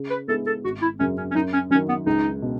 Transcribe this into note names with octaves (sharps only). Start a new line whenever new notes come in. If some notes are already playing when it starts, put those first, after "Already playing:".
Already playing: C#3
B4
G#3 B3 E4 G#4 A4
A4
G#1 F#4
E4
F#2 C#3 F#3 C#4
C#4
C#4
F#2 D#4
C#4
D#3 F#3 C#4
B3
C#2 D#4
B2